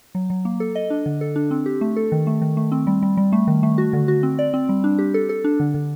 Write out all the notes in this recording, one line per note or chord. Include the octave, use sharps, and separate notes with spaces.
F#3
F#3
A#3
A4
D#5
D4
D3
A4
D4
C4
G4
A3
A4
D#3
A3
D#3
A3
C4
G3
G3
G3
A3
D#3
A3
F#4
D3
F#4
C4
D5
C4
G3
D4
G4
A4
A4
D4
D3
D3